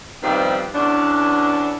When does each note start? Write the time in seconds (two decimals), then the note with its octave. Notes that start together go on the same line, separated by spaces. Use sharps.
0.22 G2 D#3 F3 G3 B3 C4
0.74 E2 B3 C#4 D4